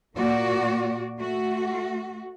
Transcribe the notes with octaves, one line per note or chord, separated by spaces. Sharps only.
A#2 A#3 F#4 D5
A3 F#4